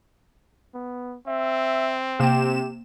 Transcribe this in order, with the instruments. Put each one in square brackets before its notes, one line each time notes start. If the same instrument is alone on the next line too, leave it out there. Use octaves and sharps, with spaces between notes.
[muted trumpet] B3
[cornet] C4 [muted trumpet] E5
[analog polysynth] C3 E7 [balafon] A#3 G5 [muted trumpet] G4